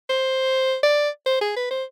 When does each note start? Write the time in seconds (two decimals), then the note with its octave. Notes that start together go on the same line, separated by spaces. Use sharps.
0.10 C5
0.83 D5
1.26 C5
1.41 G#4
1.56 B4
1.71 C5